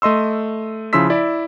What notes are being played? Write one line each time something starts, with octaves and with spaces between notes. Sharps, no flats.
A3 D#5 C6 E6
C#3 F3 E4 C6 E6 B6
E4 D5 B5